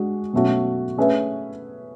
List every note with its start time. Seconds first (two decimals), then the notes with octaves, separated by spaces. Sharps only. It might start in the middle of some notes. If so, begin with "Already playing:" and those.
Already playing: G#3 D4 F#4
0.33 B2 F#3 A3 C#4 F#4
0.98 A3 C#4 G#4 B4 E5